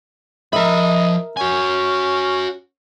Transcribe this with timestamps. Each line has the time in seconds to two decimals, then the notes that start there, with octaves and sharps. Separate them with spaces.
0.53 F3 A#4 D#5 E5 B5
1.37 C#4 F#4 G#5